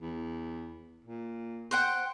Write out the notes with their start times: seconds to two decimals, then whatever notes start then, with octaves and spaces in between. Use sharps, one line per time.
0.02 E2
1.05 A#2
1.71 C5 F#5 G5